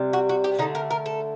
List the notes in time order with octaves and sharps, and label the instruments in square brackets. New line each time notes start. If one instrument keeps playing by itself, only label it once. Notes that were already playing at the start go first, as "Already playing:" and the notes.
Already playing: [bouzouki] C3 G3
F#4
F#4
G4
D3 A3 D#4
A#4
A#4
A4